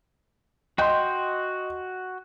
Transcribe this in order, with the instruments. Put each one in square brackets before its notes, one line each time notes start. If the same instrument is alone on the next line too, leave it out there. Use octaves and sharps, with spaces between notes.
[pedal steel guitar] F#4 G5 G6 [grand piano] D#5 C6